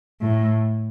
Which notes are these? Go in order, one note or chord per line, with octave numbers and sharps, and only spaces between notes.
A2